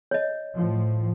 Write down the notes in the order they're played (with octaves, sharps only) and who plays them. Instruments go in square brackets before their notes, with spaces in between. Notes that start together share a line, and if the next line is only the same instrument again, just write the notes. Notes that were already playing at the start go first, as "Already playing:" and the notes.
[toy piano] C#5 D#5
[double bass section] A2 F3